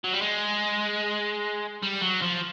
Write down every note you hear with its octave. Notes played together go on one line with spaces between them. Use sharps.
F#3
G3
G#3
G3
F#3
F3